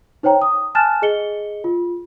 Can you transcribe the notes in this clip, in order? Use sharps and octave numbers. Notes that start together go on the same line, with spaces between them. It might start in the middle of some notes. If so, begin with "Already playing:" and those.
D#4 C5 C#5 G5 A#5
D#6
G#5 A5 F6 F#6 A6 E7
G#4 D#5 C#7 G7
F4